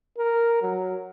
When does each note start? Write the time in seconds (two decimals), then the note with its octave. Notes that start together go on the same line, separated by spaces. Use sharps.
0.18 A#4
0.62 F#3